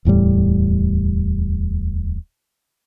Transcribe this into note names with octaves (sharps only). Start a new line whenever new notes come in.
D1 E2 A2 G3